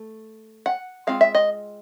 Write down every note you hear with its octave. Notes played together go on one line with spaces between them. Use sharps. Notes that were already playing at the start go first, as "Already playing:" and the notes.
Already playing: A3
F#5
G#3 C4 F4 F5
E5
D#5